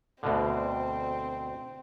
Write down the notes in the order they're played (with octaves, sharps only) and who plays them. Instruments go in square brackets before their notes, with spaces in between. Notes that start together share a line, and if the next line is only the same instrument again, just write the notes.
[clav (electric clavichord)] D2 B2 D3 [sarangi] C4